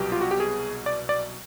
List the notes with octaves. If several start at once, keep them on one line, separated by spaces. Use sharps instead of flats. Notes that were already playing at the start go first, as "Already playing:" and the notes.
Already playing: C2 B2 F#3 G4
F4
F#4
G4
G#4
D5
D5